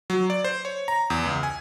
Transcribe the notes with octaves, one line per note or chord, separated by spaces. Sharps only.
F#3
D5
C5
C#5
A#5
E2
C#2
G#5